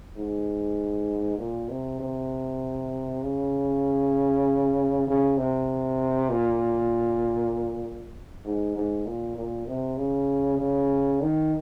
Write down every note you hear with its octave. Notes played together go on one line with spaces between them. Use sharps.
G#2
A#2
C3
C3
C#3
C#3
C3
A#2
G#2
G#2
A#2
A#2
C3
C#3
C#3
D#3